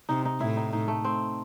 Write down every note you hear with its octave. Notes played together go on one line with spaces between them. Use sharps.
C3 D#4
D#4
A2 E4
D#4
D#4
A3
C4